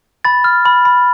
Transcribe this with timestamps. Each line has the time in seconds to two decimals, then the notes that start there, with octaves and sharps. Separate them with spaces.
0.25 B5 A6
0.44 F6
0.65 B5
0.85 B5